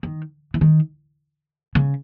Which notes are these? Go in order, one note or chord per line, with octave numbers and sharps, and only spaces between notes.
D#3
E3
D#3
C#3